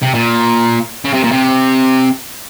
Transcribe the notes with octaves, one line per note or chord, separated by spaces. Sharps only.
C3
A#2
C#3
C3
A#2
C3